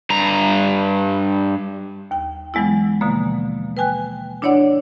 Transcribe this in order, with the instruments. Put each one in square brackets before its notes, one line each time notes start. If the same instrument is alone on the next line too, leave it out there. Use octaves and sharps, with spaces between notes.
[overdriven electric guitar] G2 A#5
[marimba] D#2 G5
E3 F#3 G#3 B3 E4
B2 D3 F3 A#3
B4 G5 G#5 F#6
D4 E4 C#5 D5 F#5